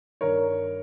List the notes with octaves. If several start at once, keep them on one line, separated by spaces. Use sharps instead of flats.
G2 D#3 A#4 C#5